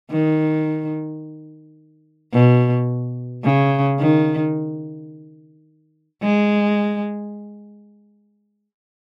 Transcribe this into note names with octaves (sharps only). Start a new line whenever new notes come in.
D#3
B2
C#3
D#3
G#3